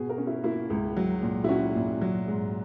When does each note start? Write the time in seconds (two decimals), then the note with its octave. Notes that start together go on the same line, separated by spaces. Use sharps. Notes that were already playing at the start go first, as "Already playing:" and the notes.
Already playing: B2 G#4
0.09 A#4
0.18 C#4
0.27 E4
0.44 A#3 E4
0.70 C#2
0.97 F#3
1.22 A#2
1.44 E4
1.49 C#4 F#4
1.75 A#2
2.01 F#3
2.28 G#2